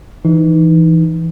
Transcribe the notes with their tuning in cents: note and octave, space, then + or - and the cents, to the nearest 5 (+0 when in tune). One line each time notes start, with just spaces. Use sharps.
E3 +5 D#4 +0